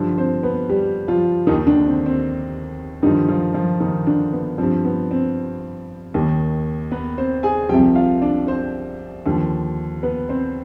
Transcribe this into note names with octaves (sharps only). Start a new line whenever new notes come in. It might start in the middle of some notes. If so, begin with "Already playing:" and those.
Already playing: G2 D3 F3
C4 C5
B3 B4
G3 G4
F3 F4
D#2 D#3 D#4
D3 D4
C4
C4
G2 D3 D#3 F3 D#4
F3 F4
F3 F4
D#3 D#4
D3 D4
B3
G2 F3 C4
B3
C4
D#2 D#3
B3 B4
C4 C5
G#4 G#5
C2 C3 F3 G4 G5
F4 F5
D4 D5
C4 C5
D#2 D3 F3
B3 B4
C4 C5